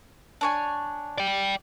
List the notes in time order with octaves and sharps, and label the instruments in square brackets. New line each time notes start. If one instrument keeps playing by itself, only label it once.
[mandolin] D4 C#5 G#5
[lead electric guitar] D5 G5